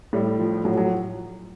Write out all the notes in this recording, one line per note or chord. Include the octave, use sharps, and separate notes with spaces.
A2 G3
F3
A2 F#3
F#3